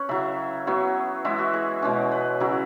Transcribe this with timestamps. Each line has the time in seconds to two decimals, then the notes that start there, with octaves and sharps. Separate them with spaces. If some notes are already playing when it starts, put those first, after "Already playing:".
Already playing: C#4 B4 C#5
0.09 C#3 F#3 E4 E5
0.67 F#3 B3 E4 C#5
1.25 E3 G#3 E4 E5
1.39 F#4
1.53 G#4
1.82 B2 G#3 C#4
2.11 B4
2.40 C#3 F#3 E4 G#4